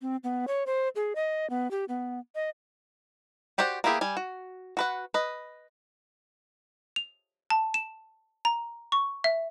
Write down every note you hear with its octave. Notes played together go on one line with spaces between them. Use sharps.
C4
B3
C#5
C5
G#4
D#5
B3
G4
B3
D#5
F#4 G4 C5 D5 F#5
A#3 B3 E4 G4 G#4
G3 G#5
F#4
F#4 B4 F#5
B4 D#5
F7
A5
E7
A#5
C#6
E5